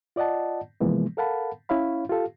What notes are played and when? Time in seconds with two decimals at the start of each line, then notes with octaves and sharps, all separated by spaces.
0.16 F4 D5 D#5 F#5 A5
0.80 C3 E3 F3 G#3 A#3 B3
1.17 A4 A#4 F5 F#5 A5 B5
1.69 C#4 E4 C#5 F5 B5
2.09 F4 G4 A4 F5